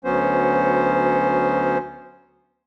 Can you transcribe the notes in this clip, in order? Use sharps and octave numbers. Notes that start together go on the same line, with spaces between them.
D2 F#3 B3 C#4 C5